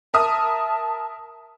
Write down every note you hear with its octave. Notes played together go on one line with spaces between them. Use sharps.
A#4 E5 A5 D#6